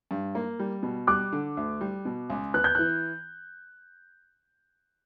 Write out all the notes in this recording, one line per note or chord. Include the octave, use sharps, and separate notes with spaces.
G2
A#3
G3
B2
G3 D6 F#6
D3
D2
G3
B2
C#2
B3 F#6
G6
E3 F#6